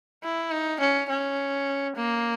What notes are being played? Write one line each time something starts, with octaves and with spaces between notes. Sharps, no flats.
E4
D#4
C#4
C#4
A#3